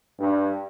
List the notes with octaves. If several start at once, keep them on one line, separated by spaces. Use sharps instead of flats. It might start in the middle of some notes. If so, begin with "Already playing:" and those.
G2